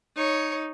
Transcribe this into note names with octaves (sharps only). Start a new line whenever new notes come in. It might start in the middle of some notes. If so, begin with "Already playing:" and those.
D#4 C#5